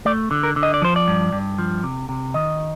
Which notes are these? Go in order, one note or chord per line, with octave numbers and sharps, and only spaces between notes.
A3 D5
D3
A#4
D3
D#5
D5
F3 C5
D5
G2
G2
F3
C3
C3
D#3 D#5